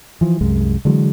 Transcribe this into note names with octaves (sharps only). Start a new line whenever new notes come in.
E3 F3
C2 F#2 G#3
D3 E3 F#3 G#3